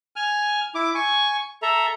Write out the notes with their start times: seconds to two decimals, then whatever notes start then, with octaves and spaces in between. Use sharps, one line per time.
0.16 G#5 F6
0.75 E4 D6
0.95 G#5 C#6
1.62 A4 E5 A#5